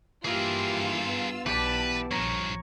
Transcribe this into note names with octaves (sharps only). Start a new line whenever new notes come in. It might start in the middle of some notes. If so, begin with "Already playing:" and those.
G2 E3 A#3 F4 G4 G#4 A#4 E6
B3
B1 E3 G4 B4 D5 A5 B6
A#1 G2 F3 C#5 A#5